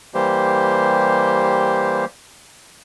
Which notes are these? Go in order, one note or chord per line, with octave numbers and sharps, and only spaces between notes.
E3 G3 A#3 G4 C5